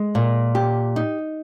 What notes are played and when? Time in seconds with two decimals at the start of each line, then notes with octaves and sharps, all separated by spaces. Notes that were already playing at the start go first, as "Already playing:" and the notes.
Already playing: G#3
0.15 A#2
0.55 G4
0.96 D#4